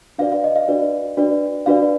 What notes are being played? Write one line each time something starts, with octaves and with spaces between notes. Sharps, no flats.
D4 F#4 B4 D5 F5
F5
D#5
F5
D4 F#4 B4 D5
D4 F#4 B4 D5
D4 F#4 B4 D5 F5